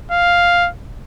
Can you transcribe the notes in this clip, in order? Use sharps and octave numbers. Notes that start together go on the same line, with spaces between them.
F5